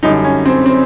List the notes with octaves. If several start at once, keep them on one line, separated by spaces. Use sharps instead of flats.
F#2 D3 G3 D#4
C#4
C4
C4